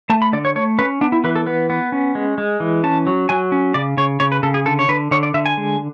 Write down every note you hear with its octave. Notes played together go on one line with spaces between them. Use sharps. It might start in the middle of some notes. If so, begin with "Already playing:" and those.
A3 A5
B5
D3 D5
C#5
A3 C#5
C#4 B4
B3 D4
E4
E3 B4
A4
B3 B4
B3
C#4
G#3
G#3
E3
C#4 A5
F#3
F#3 G#5
C#4
C#3 D5
C#3 C#5
C#3 C#5
B4
C#3 A4
G#4
D3 A4
C#5
D3 B4
D3 C#5
D5
D3 E5
G#5
G#3